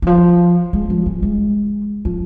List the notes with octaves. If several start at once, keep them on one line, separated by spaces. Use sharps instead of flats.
E3
F3
G#3
F3
G#3
G#3
F3